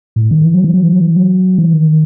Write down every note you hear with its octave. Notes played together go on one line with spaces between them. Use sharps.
A2
D#3
E3
F#3
E3
F#3
E3
F#3
E3
F#3
E3
D#3